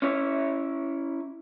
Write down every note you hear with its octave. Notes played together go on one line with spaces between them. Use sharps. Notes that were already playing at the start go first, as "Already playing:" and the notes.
C#4 E4 C#5 E5